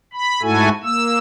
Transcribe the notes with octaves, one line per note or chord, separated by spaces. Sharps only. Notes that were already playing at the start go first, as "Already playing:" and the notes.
B5
G#2 A3 E4 F#4 A4 G#5
A#3 E6